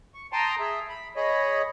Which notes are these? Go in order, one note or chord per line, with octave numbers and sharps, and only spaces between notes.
C#6
G5 A5 A#5 C6 D#6
G#4 E5
B5
G#4 C#5 D#5 B5